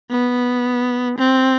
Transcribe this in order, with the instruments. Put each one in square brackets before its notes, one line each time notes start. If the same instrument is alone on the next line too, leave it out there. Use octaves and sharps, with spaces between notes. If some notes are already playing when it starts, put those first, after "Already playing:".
[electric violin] B3
C4